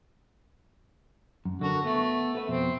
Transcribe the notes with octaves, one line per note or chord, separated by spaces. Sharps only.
F#2
D3 F#4 A4 A#4
A3 B3
A4 B4 E5
F2 B2 C4